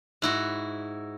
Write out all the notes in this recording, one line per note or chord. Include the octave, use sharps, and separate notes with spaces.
G#2 E4 F#4